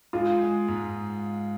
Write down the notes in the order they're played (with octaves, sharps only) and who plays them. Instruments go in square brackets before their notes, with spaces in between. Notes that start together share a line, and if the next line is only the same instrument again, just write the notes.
[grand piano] G#3 [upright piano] F4
[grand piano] G#3
G#2